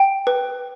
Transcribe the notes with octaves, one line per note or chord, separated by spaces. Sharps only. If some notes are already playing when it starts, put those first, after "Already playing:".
Already playing: G5
B4